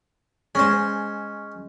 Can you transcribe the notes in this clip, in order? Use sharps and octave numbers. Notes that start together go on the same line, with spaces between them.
G#3 C#4 C5